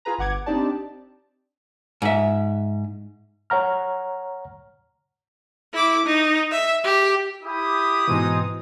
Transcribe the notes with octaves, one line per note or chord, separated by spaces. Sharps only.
F4 G#4 B4 A#5
G1 F#5 D6 G#6
C4 D4 D#4 G4 D5 A5
G#2 E5
C#5 F#5 A#5 F6
E4 D6
D#4
E5
G4
E4 G4 D#6
G#2 B2 E3 G#3 C4 D#4